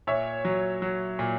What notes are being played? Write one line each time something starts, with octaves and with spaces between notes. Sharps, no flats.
A#2 C#5 E5
F#3
F#3
A#2